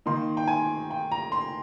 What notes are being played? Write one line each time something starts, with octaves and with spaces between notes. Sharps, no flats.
D#3 A#3 D#4 C6
G5
G#5
G5
A#5
C6